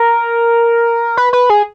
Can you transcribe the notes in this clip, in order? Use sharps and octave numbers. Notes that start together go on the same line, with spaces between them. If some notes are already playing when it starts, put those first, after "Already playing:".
Already playing: A#4
B4
B4
G#4